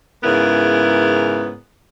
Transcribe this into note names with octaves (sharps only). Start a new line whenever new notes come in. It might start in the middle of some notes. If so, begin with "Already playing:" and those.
G#2 C#3 B3 E4 A#4